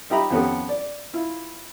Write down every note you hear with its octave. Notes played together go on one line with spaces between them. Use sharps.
D#4 F4 G4 E5 A#5 B5
F2 D#3 B3 C#4 G4 A4
D5
E4 F4